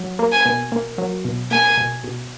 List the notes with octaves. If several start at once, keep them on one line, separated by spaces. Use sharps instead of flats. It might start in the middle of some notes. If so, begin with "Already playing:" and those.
Already playing: F#3
A#3
G#5
B2
A#3
F#3
B2
A#3 G#5
B2
B2